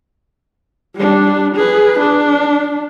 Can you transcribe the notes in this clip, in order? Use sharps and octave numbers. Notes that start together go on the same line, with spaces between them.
G3 D4
G#4 B4
D4